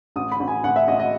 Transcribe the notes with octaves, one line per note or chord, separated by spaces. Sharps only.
A1 D#6
B5
A1
G#5
A1 F#5
E5
A1 D#5
D#5